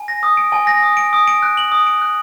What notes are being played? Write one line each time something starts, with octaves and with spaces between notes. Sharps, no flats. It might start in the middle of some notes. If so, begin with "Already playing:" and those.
Already playing: G#5
A#6
D#6
D7
G#5
A#6
D#6
D7
D#6
D7
F#6
F#7
D#6
D7
F#6